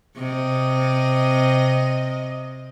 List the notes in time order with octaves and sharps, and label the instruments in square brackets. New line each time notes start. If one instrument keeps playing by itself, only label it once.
[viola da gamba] C3 D#5